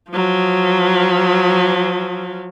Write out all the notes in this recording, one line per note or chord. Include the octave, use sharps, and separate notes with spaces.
F3 F#3